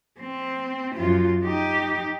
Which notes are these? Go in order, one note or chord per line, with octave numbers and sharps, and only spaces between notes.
C4
F#2 F4
D#4 G4